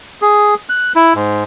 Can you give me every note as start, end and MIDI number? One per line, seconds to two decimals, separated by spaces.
0.22 0.54 68
0.69 0.93 90
0.96 1.13 64
1.14 1.44 44